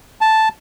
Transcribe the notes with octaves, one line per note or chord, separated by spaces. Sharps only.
A5